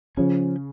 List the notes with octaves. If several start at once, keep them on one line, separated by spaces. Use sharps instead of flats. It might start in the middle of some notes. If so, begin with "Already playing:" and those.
C#3 F3 C#4